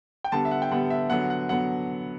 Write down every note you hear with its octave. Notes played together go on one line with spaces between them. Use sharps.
G5
D3 G3 B3 A5
E5
F#5
G5
D3 G3 B3 F#5
E5
D3 F#3 B3 F#5
F#5
D3 F#3 B3 F#5